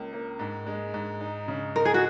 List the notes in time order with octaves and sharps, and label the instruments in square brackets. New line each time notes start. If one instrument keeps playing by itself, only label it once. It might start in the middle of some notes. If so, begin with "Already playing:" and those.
Already playing: [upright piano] C#2 A#3
A#3
G#2
G#3
G#2
D#4
C#3
[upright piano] D#4 [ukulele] A#4
[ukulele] G#4
F#4